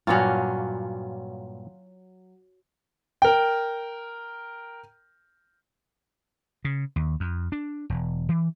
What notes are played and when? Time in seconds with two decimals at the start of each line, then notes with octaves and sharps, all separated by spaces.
0.07 G2 A#2 F#3 A#3 C#4 F4
3.22 A#4 G5
6.65 C#3
6.96 D#2
7.20 F2
7.52 D4
7.90 E1
8.29 E3